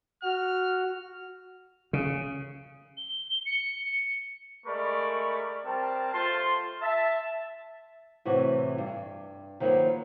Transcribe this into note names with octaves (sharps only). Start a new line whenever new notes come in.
F#4 F6
C#3
G7
C#7
G#3 A3 A#4 D5 B5 C#6
G3 C4 A#4 A5
A3 F4 C5 A5 C6
E5 A5
A2 C3 E3 F#4
G2
D#3 F3 F#3 A#3 B3